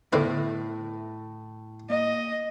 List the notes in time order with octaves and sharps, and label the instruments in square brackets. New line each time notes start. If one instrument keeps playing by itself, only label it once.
[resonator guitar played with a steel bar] A2 [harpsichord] D3 C4 B4 [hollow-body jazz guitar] B3 D#5 E5
[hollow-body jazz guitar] A#3 [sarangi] D#5